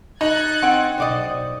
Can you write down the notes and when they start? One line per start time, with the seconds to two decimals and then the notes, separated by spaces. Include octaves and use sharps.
0.21 D#4 F#6 G#6 A6
0.62 C4 F#5 G5
0.98 B1 C5 D5 D#5